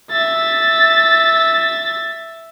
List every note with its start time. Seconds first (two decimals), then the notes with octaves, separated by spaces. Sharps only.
0.11 E5 A6